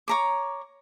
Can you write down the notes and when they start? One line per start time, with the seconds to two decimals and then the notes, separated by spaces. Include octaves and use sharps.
0.08 C#5 A#5 D6